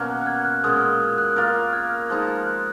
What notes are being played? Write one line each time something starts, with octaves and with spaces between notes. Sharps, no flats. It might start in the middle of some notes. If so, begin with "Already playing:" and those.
Already playing: B2 F#3 A#3 C#4 F#4
F#6
F#6
F6 G#6
F#6
A#2 G#3 C#4 D#6
F6
F6
F#6
A#3 F4 A#4 F#6
F6 G#6
F3 G#3 D#4 F#6
F6
F#6